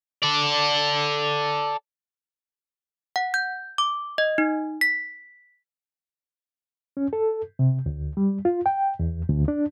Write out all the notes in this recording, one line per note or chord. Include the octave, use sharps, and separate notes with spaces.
A4 D5
F#5
G6
D6
D#5
D#4
B6
C#4
A4
C3
D2
G3
F4
G5
E2
D2
D4